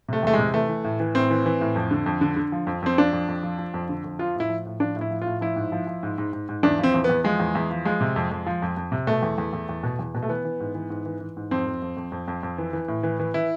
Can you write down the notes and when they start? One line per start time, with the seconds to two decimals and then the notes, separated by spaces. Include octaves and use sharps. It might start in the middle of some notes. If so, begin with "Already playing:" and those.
0.08 C3 A3
0.23 E2 A3
0.33 G#3
0.39 C3
0.54 E3 A3
0.69 E3
0.84 A2
1.00 E3
1.15 A2 C4
1.30 E3
1.46 E3
1.61 A2
1.76 F2
1.91 D3
2.06 F2
2.21 D3
2.36 D3
2.52 F3
2.67 F2
2.82 F2 C4
2.98 F3 D4
3.13 F2
3.28 F2
3.43 F3
3.58 F3
3.74 F2
3.89 D3
4.04 F2
4.19 F3 F4
4.35 A2 E4
4.50 F3
4.66 A2
4.80 F3 D4
4.96 A2
5.01 E4
5.11 F3
5.22 A2 F4
5.41 F3 E4
5.56 G#2
5.72 F3
5.87 F3
6.03 G#2
6.18 G#2
6.33 G#2
6.49 G#2
6.63 E2 D4
6.79 F3 C4
6.94 E2
7.04 B3
7.09 E2
7.24 F3 G#3
7.40 E2
7.55 E2
7.70 F3
7.85 F3 G#3
8.01 C3
8.16 F2
8.31 F2
8.47 F3
8.62 F2
8.77 F2
8.92 C3
9.07 B2 A3
9.22 E2
9.38 E2
9.53 E2
9.69 E2
9.83 B2
9.99 E2
10.15 B2
10.23 A3
10.29 E3 B3
10.45 E3
10.60 G#2
10.75 E3
10.90 G#2
11.06 E3
11.21 E3
11.37 G#2
11.51 F2 C4
11.66 F2
11.82 F2
11.97 F2
12.12 F2
12.28 F2
12.43 F2
12.58 E3
12.73 E3
12.88 A2
13.03 E3
13.19 E3
13.34 E3 E4